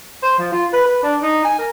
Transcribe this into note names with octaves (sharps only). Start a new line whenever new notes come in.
C5
F3
F4
B4
B4
D4
D#4
G#5
A#4